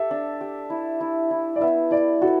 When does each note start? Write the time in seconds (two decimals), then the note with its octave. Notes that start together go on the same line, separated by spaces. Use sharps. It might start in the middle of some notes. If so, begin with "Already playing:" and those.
Already playing: G4 A4 E5
0.11 D4
0.41 G4
0.70 E4
1.01 E4
1.31 E4
1.56 D5
1.61 B3 E5
1.91 E4 D5
2.22 F#4 A4